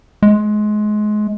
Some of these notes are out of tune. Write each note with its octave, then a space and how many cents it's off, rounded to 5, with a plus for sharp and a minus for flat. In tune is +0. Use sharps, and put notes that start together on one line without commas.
G#3 +25